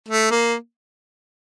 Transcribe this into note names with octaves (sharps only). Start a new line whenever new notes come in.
A3
A#3